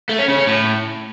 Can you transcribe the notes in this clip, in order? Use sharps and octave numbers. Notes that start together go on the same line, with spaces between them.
A3
C#4
C#3
C#4
A2